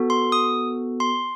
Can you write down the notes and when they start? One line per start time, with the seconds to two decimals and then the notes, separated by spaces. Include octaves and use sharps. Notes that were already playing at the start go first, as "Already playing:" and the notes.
Already playing: B3 F#4 A4
0.10 C6
0.32 D#6
1.00 C6